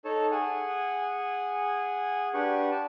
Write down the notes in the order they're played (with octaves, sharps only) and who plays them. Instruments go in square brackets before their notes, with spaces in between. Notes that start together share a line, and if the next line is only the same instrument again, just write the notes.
[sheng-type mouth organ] D#4 A4 C#5 A5
G#4 F#5 G#5
D4 G4 B4 F#5 C#6
D5 A5